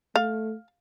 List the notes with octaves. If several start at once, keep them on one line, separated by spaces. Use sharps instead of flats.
A3 F5